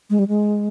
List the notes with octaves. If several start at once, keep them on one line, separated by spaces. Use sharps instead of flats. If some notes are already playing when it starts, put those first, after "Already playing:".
G#3
G3
G#3